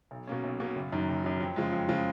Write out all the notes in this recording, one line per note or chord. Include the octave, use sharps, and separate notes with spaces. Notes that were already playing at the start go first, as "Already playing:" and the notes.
B1
B2 A#3 C#4
B1
B2 A#3 C#4
F#1
F#2 D#3
F#1
F#2 D#3
F2
C#3 F3 G#3
F2
C#3 F3 G#3